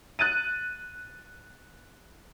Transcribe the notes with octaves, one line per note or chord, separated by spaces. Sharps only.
F#6 A6 D#7